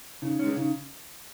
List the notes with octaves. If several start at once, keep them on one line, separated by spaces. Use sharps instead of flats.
C#3 D#4
G#3 C#4
C#3 D#4